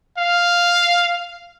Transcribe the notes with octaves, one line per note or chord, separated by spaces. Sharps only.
F5